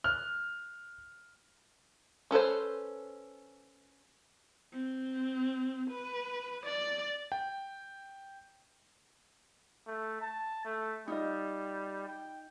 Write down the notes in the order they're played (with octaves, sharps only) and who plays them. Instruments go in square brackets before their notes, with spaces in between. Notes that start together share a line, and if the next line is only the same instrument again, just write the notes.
[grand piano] F6 F#6
[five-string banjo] C#4 A4 B4 C5
[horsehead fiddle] C4
B4
D5
[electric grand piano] G5
[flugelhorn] A3
A5
A3
[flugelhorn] G3 [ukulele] D#4 F4 D#5
[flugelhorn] G5